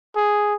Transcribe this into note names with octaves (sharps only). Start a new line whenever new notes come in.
G#4